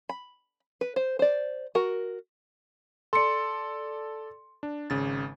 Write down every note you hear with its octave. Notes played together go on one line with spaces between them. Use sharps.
B5
B4
C5
C5 D5
F#4 A#4
A4 D5 C6 C#7
D4
G#1 C#3 A6